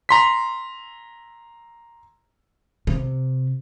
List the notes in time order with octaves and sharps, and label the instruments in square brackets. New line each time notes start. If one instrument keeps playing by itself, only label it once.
[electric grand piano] A#5 C6 B6
[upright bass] C3